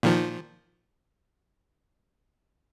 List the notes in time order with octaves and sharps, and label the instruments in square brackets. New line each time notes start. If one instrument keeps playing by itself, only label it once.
[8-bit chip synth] A#2 D#3 F3